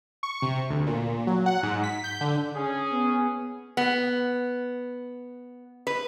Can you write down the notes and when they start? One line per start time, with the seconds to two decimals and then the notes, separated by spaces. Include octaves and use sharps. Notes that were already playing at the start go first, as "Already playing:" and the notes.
0.23 C#6
0.42 C3
0.70 D2
0.87 A#2
1.27 F#3
1.46 F#5
1.63 G#2
1.83 B6
2.04 G6
2.21 D3
2.55 C#4 G#4
2.91 B3
3.77 B3
5.87 B4